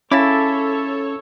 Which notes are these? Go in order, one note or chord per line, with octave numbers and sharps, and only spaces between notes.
C#3 C#4 E4 A4 C#5 A5 D6